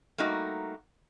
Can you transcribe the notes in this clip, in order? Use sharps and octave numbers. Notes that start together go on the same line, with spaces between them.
G3 A3 A#3 D#4 F#4